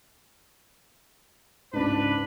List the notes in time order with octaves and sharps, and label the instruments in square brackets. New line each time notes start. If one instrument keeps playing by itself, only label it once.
[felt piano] C#2 G#2 [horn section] D4 B4